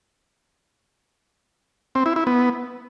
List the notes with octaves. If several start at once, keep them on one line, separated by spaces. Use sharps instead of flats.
C4
E4
E4
B3